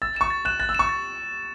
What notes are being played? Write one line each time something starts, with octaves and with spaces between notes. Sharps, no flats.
E6 A6
C#6 E7
A6
F#6 E7
F#6 A6
E6
C#6 E7
A6